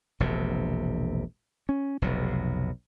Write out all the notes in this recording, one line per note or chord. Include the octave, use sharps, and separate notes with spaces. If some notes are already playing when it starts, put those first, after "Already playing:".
E1 A#1 C3
C#4
F1 B1 B2